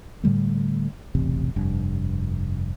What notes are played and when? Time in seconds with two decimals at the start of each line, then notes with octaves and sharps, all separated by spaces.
0.23 A2 D3 G3 A3
1.15 E1 A1 C3
1.56 F1 G2